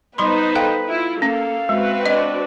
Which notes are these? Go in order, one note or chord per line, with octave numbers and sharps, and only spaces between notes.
G3 B3 D#4 B4 C5 B5 C6
A4 F5 G5
E4 F4
A#3 C#4 A4 F5
G#3 C4 F#4 B4
D4 D#5